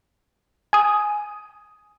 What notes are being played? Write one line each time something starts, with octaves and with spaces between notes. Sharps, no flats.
G#5 D#6